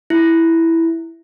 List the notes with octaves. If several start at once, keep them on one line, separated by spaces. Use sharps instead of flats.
E4